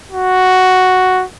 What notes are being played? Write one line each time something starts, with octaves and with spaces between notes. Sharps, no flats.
F#4